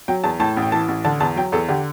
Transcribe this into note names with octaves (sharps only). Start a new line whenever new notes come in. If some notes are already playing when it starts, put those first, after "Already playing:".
F#3 G5
E2 A5
A2 A5
A1
G5
E3 A5
A1
D3 A5
E2 A5
F#3 G5
E2 A4
D3 G4